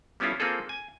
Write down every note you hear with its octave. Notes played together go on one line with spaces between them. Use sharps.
G3 B3 C#4 E4 F4 A4
A#3 C4 F4 G#4 A4
G#5